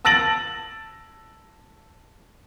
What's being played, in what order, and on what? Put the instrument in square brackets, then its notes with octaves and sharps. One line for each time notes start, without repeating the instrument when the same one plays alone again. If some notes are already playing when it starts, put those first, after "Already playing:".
[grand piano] A5 E6 A6 A#6 D7 F#7